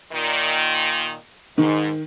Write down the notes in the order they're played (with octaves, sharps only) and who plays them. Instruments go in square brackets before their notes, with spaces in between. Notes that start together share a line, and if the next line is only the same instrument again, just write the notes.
[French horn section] A#2 D#3
[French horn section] G#2 [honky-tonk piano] D#3